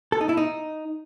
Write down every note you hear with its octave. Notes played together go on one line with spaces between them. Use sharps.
A4
D#4
E4
D#4